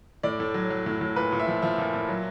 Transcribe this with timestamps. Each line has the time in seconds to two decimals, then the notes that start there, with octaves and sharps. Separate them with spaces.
0.23 A2 D5
0.40 A2
0.54 F#3
0.70 F#3
0.86 A2
1.01 A2
1.16 A#2 B4
1.32 A#2
1.39 E5
1.47 F3
1.62 F3 E5
1.78 A#2
1.93 A#2
2.09 F#3